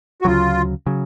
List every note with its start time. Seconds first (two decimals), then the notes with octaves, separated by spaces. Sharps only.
0.21 F#4
0.25 D2 C#3 F#3 F4
0.86 C#3 F#3